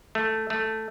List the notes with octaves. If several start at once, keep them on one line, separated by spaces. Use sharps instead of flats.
A3
A3